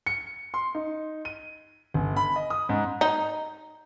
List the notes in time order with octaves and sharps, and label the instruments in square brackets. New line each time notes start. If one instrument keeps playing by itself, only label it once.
[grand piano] C#7
C6
D#4
D#7
G1
B5
D#5
D#6
G#2
[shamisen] D#4